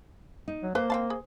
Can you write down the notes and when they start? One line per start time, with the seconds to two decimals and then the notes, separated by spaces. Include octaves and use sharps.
0.48 D#4
0.63 F#3
0.75 F3 A#3 B4 C5
0.90 C4 F5 A5
1.10 G#4